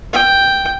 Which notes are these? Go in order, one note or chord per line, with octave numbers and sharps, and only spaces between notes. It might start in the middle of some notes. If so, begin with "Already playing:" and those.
G5